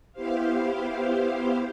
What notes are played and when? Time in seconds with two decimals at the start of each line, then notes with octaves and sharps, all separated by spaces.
0.13 B3 E4 G4 C5 F5